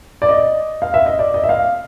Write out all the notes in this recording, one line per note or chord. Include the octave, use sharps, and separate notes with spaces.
D5
D#5
F5
E5
D#5
D5
D#5
E5
F5